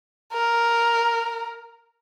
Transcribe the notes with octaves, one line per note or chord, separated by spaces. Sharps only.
A#4